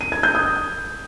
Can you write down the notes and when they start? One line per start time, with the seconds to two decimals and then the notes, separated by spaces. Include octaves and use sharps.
0.01 D#7
0.12 G#6
0.23 G6
0.35 D#6